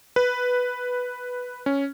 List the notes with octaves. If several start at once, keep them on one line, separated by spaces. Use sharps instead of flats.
B4
C#4